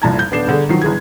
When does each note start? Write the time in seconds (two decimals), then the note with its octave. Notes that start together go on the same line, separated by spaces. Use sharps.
0.02 F1 C2 A#2 A5 A#5 G#6
0.19 G6
0.31 D#1 B3 D4 C7 E7
0.47 G1 D3 G#4
0.69 D#3 F3 F#3 C7
0.82 G1 E3 G#4 G#6